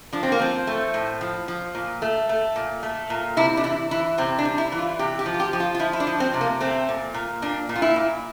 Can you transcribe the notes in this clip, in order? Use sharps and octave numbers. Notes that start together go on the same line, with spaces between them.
F3 D4
C4
A#3
F3 C4
A3
A2
F3
F3
A#2
A3
A3
A#2
A3
A#2
C3 E4
D4
E3 E4
E3 E4
C3 C4
D4
G3
E4
E3
F4
C3 G4
G4
F3
F4
G4
F3
F4
F4
F3 E4
E4
D4
F3
C4
C3
A#3
A3 C4
A#2
A#2
A#2 D4
A#2
F4
E4
A#2